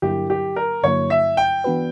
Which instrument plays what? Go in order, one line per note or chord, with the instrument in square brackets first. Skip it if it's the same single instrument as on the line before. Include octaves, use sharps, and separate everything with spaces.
[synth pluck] G2 D3 F#3 A#3 E4 [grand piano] G4
[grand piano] G4
A#4
[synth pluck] G2 D3 F#3 A#3 E4 [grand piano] C#5
[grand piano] E5
G5
[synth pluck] E3 B3 D4 F#4 B4